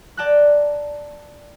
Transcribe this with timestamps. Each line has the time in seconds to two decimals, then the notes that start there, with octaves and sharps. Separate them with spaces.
0.17 D5 G5 A5 A#5 F#6